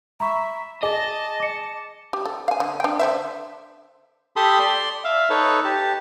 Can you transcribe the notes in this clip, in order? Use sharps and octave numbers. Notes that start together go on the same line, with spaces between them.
E5 A#5 B5 C#6
G#4 D#5 A5 D6
D6 C#7
G4
A4
F5 G#5
D3
D4 G5
D3 C5 E5
G4 A4 A5 B5 C6 D#6
D5 C6
E5 F5
D#4 A4 B4 C#5
G4 A5